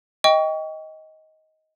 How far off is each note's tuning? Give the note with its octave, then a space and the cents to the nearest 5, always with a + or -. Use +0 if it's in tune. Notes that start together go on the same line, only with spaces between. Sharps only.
D#5 +15 G5 +5 C#6 +30